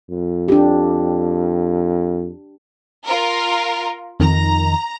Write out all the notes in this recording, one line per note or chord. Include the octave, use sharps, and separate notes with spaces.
F2
D4 G4
F4 A#4
F2 D#3 A#5